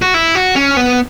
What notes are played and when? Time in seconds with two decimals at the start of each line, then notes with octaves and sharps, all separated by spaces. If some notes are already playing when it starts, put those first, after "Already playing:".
0.02 F#4
0.14 E4
0.35 F#4
0.56 C#4
0.77 B3